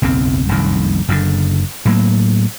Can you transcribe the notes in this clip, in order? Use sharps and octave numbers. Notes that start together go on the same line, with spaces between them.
F#1 B1 E2 C4
F1 C2 F#2 D#3
F#1 F#2 A2 D3
A2 F#3 A#3